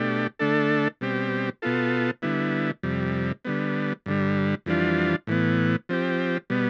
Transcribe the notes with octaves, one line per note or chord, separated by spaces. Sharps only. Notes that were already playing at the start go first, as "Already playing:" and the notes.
Already playing: B2 A3 D4 G4
D3 A3 D4 A4
B2 G3 C4 G4
B2 B3 F4 A4
D3 G3 B3 E4
F2 C3 G3
D3 G3 B3
G2 D3 G3
F2 E3 G3 D4 F4
A2 E3 B3
F3 C4 G4
B2 G3 B3